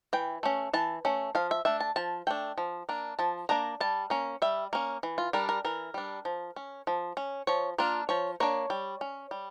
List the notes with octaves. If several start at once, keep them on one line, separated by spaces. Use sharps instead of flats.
E3 G5
A3 C#4
E3 A5
A3 C#4
F3 F5
E5
A3 D4 E5
A5
F3 A5
A3 D4 G5
F3
A#3 D4
F3 A5
A#3 D4 A#5
G3 A5
A#3 C#4
G3 E5
A#3 C#4
E3
F4
G3 D4 A#4
A#4
E3 A#4
G3 D4
F3
C#4
F3
C#4
F3 C#5
A#3 D4 F4
F3 C#5
A#3 D4 C#5
G3
C#4
G3